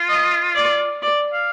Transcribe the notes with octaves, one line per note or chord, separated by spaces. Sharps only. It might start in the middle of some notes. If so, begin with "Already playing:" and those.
Already playing: F4
D#5
D5
D5
F5